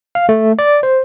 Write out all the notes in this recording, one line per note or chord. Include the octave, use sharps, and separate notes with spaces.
F5
A3
D5
C5